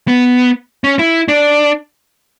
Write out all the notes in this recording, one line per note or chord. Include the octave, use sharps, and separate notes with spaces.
B3
C#4
E4
D4